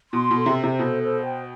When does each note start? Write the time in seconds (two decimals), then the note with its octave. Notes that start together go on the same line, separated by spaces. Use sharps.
0.13 B2 C6
0.31 B2
0.36 A4
0.46 C3
0.58 C5
0.64 C3
0.79 B2 A4
1.02 C5
1.23 G5